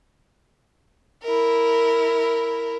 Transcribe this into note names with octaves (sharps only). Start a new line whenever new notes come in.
E4 A#4